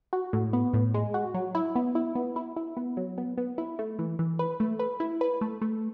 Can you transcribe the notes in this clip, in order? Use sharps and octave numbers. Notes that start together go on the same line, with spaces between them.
F#4
A2
B3
A2
G#3
F#4
F#3
E4
B3
E4
B3
E4
E4
B3
F#3
B3
B3
E4
A3
E3
E3
B4
A3
B4
E4
B4
A3
A3